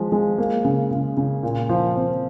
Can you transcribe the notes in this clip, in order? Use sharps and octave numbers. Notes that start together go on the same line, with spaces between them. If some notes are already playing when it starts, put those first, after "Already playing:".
Already playing: F3 G#3
G#3
A#3
C#3
C#3
C#3
A#2
F3
C4